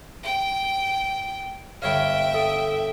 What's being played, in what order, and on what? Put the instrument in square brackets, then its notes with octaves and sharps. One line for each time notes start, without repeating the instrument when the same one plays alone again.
[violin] G5
[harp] G1 C#5 F5 [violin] E5 G5
[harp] A4 D#6